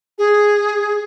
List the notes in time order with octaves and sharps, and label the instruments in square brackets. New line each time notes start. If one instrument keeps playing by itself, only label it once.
[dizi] G#4